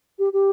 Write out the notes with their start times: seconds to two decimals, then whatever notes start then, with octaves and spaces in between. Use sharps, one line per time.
0.19 G4
0.33 G4